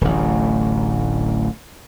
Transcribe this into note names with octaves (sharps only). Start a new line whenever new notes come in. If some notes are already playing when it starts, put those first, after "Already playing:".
D1 A1